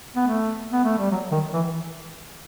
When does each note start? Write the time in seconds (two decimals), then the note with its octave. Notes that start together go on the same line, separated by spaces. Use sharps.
0.16 B3
0.27 A3
0.71 B3
0.84 A3
0.98 G3
1.11 F#3
1.32 D#3
1.53 E3